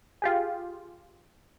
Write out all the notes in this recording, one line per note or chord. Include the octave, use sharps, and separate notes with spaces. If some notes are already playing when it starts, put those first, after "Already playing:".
F4 G4 G#4